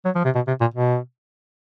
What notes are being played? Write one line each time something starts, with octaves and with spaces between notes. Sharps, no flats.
F#3
F3
C3
B2
C3
A#2
B2